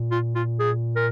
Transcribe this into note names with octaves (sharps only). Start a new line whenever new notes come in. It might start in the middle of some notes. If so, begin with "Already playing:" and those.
Already playing: A#2
F4
F4
G#4
A#4